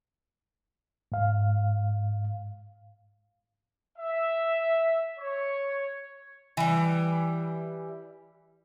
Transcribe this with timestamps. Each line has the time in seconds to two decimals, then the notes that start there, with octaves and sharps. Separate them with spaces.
1.12 G#2 F5
3.98 E5
5.18 C#5
6.57 E3 G3